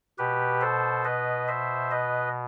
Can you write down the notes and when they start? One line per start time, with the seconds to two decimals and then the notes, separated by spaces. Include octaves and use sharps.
0.18 B2 G4 B4
0.61 A4 C5
1.05 B4 D#5
1.48 C5 E5
1.91 B4 D#5